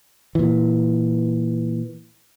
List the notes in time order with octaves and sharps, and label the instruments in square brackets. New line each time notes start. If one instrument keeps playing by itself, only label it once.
[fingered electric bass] A#2 E3